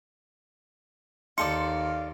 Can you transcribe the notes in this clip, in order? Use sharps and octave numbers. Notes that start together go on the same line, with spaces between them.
D#2 D#4 A4 D5 F5 C6 C#7